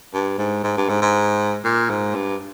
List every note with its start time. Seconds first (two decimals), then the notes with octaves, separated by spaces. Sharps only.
0.14 G2
0.38 G#2
0.64 G#2
0.77 G2
0.89 G#2
1.02 G#2
1.64 A#2
1.90 G#2
2.15 G2